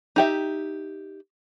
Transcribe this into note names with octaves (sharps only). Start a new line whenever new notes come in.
D#4 G4 E5